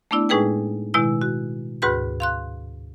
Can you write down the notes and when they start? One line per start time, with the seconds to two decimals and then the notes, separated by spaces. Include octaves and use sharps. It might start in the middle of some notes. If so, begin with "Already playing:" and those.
0.11 A3 B3 D4 E4 D5
0.29 A2 G#3 D#4 G#4 B4 G5
0.94 B2 D#3 G#3 E4 E6
1.21 F#4
1.82 D2 G#2 F#4 B4 B5 G6
2.20 F5 C6 F#6